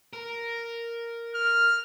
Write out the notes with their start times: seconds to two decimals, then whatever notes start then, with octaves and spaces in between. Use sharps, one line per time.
0.13 A#4
1.35 F6